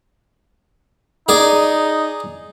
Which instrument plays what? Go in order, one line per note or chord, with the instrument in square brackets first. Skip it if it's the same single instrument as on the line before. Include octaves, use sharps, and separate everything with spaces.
[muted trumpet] D#4 [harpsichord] G#4 D5